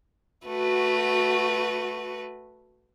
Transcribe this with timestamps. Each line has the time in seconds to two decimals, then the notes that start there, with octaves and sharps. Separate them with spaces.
0.46 A3 F#4 B4